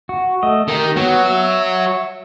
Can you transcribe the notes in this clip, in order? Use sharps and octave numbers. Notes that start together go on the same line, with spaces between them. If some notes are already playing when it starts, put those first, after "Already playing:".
F#4
A3 D#5
D#3 G4
F#3 B3 F#4
E5